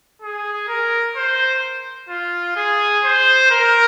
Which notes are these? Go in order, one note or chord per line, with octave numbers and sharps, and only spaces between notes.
G#4
A#4
C5
F4
G#4
C5
A#4